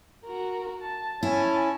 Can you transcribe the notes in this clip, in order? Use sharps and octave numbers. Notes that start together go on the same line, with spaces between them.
F#4 A#4
A5
C#4 E4 G#5 A5